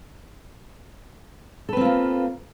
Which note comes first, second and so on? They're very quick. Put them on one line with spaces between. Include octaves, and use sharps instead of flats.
A4 B4 C4 F4 A#3